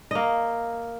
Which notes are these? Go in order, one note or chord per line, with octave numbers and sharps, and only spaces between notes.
A#3 D#5